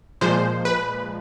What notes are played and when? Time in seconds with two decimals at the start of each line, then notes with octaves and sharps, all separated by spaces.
0.21 A#2 F3 G#3 C5
0.65 B4